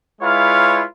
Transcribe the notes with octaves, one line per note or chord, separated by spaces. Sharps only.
G#3 E4 F4 B4 C#5 F5